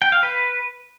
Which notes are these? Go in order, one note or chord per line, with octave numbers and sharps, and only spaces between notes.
G5
F5
B4